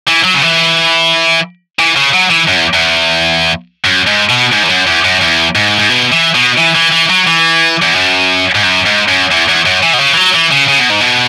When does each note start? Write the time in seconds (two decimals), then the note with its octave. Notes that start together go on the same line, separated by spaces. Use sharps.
0.08 E3
0.25 F#3
0.35 C#3
0.43 E3
1.79 E3
1.96 C#3
2.14 F#3
2.30 E3
2.48 F#2
2.56 E2
2.74 E2
3.85 F#2
4.07 G#2
4.30 B2
4.53 G#2
4.64 E2
4.70 F#2
4.87 E2
5.05 F#2
5.21 E2
5.55 G#2
5.79 G#2
5.89 B2
6.12 E3
6.35 B2
6.58 E3
6.76 E3
6.92 E3
7.10 F#3
7.27 E3
7.82 E2
7.95 F#2
8.55 G#2
8.63 F#2
8.86 G#2
9.09 F#2
9.32 E2
9.49 E2
9.66 F#2
9.83 E3
9.93 B2
10.00 C#3
10.13 E3
10.17 F#3
10.34 E3
10.51 C#3
10.69 C#3
10.79 B2
10.90 G#2
11.01 B2